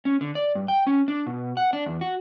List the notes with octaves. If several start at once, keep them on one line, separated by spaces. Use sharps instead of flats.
C#4
D3
D5
G2
G5
C#4
D4
B2
F#5
D4
E2
F#4